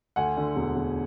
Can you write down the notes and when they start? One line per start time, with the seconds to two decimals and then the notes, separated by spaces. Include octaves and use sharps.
0.16 D2 F#5 G#5
0.37 D3
0.56 E1
0.76 E1